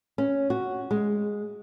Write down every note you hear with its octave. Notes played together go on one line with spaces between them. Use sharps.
C#4
F#4
G#3